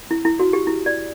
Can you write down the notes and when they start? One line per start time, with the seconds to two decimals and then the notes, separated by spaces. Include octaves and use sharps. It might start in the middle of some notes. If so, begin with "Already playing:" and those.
0.11 E4
0.25 E4
0.39 F#4
0.53 G4
0.67 E4
0.86 D5